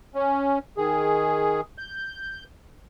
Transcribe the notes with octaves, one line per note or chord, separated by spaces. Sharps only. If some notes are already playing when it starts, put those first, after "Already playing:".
C#4
D#3 G#4
G6